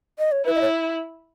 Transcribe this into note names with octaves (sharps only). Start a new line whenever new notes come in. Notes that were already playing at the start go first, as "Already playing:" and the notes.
D#5
C#5
E4 B4
D#5
C#5